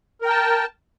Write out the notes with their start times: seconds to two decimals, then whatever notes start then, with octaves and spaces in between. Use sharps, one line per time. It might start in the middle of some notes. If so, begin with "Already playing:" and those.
0.22 A#4
0.26 G5
0.30 A5